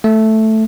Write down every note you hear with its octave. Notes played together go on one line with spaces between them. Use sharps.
A3